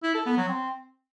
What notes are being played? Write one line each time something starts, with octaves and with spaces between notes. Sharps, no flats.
E4
A4
B3
F#3
C4